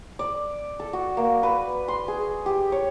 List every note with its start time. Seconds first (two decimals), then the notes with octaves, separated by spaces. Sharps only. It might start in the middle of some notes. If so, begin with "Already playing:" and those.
0.19 D5
0.80 A4
0.93 F#4
1.17 A#3
1.43 B4
1.88 C6
2.08 G#4
2.46 G4
2.72 C#5